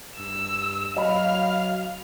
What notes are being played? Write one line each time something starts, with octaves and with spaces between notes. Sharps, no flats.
G2 E6
F#3 D#5 F5 B5